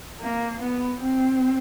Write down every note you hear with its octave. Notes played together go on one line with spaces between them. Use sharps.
A#3
B3
C4